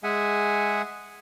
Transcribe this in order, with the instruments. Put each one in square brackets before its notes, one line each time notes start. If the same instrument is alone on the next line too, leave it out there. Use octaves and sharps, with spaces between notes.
[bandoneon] G#3 G#4 E5 F#5 G#5